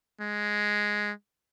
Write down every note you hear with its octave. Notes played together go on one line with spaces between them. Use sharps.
G#3